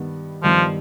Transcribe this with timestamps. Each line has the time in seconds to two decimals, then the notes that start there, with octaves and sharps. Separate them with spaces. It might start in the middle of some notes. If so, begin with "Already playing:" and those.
Already playing: G2 D#3 G3 B3
0.43 G2 D#3 F3 G3 B3